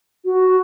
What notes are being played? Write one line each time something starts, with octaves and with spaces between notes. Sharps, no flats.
F#4